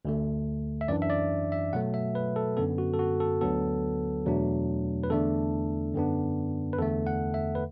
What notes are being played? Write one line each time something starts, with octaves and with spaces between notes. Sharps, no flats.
D2 D3 A3
E5
F#2 E3 D4 D5
E5
D5
E5
B2 F#3 A3 F#5
E5
B4
A4
F#2 D3 B3 A4
F#4
A4
F#4
A4
D2 D3 F#3 B3 A4
E2 B2 F#3 A3 D4
B4
E2 D3 A3 D4 A4
F#2 D3 B3 D4
B4
E2 D3 A3 A4
F#5
E5
B4